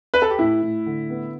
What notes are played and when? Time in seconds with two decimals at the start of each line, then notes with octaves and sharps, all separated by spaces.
0.14 B4
0.22 A4
0.30 G4
0.39 A2 E4
0.62 A2
0.86 D3
1.10 B3